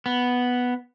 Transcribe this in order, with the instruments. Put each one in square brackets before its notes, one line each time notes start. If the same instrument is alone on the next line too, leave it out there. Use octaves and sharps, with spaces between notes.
[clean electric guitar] B3